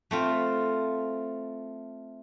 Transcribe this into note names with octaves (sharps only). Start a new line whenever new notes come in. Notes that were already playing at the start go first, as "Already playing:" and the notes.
A3 C4 F4